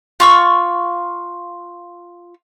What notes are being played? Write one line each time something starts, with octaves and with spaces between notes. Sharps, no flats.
F4 C#6 E6